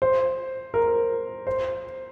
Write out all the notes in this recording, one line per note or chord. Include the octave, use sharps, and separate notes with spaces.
C5
A#4
C5